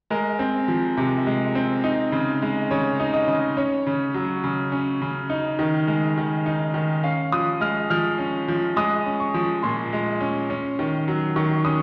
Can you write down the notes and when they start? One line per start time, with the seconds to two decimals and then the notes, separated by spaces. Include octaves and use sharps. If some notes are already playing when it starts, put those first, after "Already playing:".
0.10 G#3 A#4
0.39 C4
0.68 F3
0.97 C3
1.26 G#3
1.55 C4
1.84 D#4
2.12 C#3
2.42 G#3
2.71 C#3 C#5
3.00 D#4
3.14 D#5
3.28 C#3
3.57 C#4 C#5
3.87 C#3
4.14 F#3
4.44 C#3
4.72 C#4
5.01 C#3
5.30 D#4
5.59 D#3
5.87 G#3
6.17 D#3
6.46 D#4
6.74 D#3
7.03 C#4 F5
7.32 F3 D#6
7.61 G#3 F6
7.90 F3 F6
8.18 C#4
8.48 F3
8.76 G#3 D#6
9.06 C#4
9.20 C#6
9.34 F3
9.63 A#2 C6
9.93 G#3
10.20 C#4
10.50 C#4
10.79 D#3
11.08 F#3
11.36 D#3 C#6
11.65 C#4 D#6